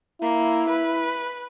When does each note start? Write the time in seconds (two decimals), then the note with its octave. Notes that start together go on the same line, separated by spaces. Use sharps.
0.22 A#3 E4
0.69 B4